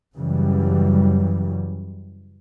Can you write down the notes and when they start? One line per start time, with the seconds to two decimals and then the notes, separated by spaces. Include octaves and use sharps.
0.15 F#2 C#3 E3 F#3 G3